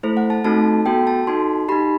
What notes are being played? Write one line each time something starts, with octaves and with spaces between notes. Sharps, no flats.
A3 E4 A4 C5
F#5
A5
A3 C4 D#4 F#4 A4 A5
B3 F#4 A4 G5
A5
D#4 F#4 A4 C6
D#4 G4 B5